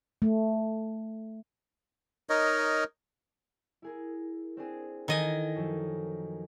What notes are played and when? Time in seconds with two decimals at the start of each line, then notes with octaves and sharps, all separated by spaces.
0.22 A3
2.29 D#4 A#4 C#5 D#5
3.82 E4 G#4 A#4
4.57 C4 D4 G#4
5.08 D#3 E3 A4 D#5 G#5
5.55 F#2 F3 A4